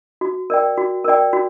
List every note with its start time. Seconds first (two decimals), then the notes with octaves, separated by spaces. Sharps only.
0.21 F#4
0.50 A#4 D5 G5
0.77 F#4
1.04 A#4 D5 G5
1.33 F#4